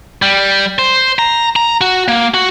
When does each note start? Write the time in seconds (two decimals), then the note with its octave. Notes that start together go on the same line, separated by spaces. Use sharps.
0.22 G3
0.79 C5
1.19 A#5
1.56 A#5
1.81 F#4
2.08 A#3
2.34 F#4